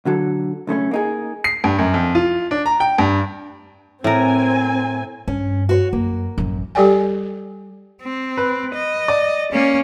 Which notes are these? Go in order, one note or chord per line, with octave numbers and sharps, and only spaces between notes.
B1 D3 F#3 A4
B1 C#3 A3 C#4
A#3 D#4 G#4
C7
G2
F#2
F2
F4
D4
A#5
G5
G2
A2 C4 A#4 G#5
G2 C#4
F#4 C5 C#5
F#2 A#3
A1 F#2
G3 G4 A4 D5 G5 G#5
C4
B4
D#5
D5
A#3 C#4